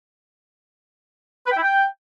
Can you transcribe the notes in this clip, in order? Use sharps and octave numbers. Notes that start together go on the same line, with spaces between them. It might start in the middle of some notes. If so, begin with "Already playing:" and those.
B4
G5
E4
G5